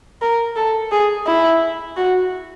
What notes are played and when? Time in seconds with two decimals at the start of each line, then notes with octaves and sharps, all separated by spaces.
0.22 A#4
0.56 A4
0.92 G#4
1.26 E4
1.97 F#4